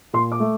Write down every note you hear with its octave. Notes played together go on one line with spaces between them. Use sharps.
A#2 C6
D6
A3